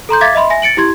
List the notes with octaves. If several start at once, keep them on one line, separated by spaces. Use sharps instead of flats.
A4 A#5 C6 G6
E5 F5 D6 G#6 A6 B6
D#5 E5 B5 C6
E5 G#5 A#6
A6 C#7 D7 F#7
E4 G4 C6 G#6